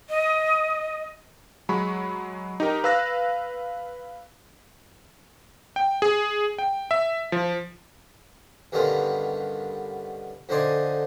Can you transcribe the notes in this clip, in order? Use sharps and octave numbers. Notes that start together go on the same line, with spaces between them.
D#5
F#3 G#3 B5 C#6
D#4 G4 A#4
B4 F5 E6 F#6 A#6
G5
G#4
G5
E5
F3
G2 D3 D#3 B3 C#4 F4
F2 D3 D#4 C5 D5 G#5